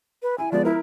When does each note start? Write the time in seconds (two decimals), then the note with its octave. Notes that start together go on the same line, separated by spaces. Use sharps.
0.23 B4
0.38 E4 G#5
0.52 F3 G#3 B3 D5
0.65 E4 A#4